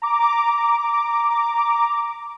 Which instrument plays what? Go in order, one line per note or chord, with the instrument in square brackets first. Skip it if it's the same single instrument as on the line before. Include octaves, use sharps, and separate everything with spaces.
[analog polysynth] A#5 D6